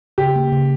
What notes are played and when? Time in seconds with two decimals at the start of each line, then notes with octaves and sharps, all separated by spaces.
0.18 C#3 G4
0.36 A#3
0.52 C#3